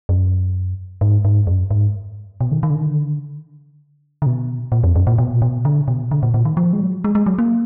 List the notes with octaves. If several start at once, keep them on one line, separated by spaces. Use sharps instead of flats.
F#2
G#2
G#2
F#2
G#2
B2
D#3
D#3
D3
D#3
D3
D3
B2
A#2
F2
F#2
A#2
B2
A#2
B2
D3
B2
D3
A#2
A#2
D#3
F3
G#3
F#3
G#3
G#3
F#3
A#3